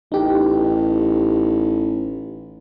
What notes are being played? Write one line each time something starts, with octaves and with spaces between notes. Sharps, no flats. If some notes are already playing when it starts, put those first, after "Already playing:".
A1 D#4 G4